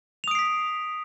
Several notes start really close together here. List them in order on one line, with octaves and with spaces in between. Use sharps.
F7 D#6 D7 C7 B6